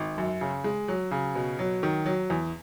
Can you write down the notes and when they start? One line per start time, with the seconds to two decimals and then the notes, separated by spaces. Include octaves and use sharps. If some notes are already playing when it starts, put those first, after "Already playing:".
Already playing: G#1
0.18 F#2
0.41 C#3
0.64 G#3
0.88 F#3
1.11 C#3
1.35 B2
1.59 F#3
1.83 D#3
2.06 F#3
2.30 E2